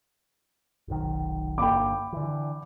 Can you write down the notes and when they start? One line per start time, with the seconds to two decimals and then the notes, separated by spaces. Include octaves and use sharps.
0.88 F1 B1 D#3
1.58 G1 A#3 G5 B5 D6
2.13 D3 E3